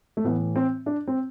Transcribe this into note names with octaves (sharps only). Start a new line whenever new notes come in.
A3
A2 E3 B3
C4
D4
C4